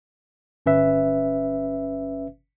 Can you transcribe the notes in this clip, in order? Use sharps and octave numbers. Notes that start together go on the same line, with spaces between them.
G1 C#4 B4 E5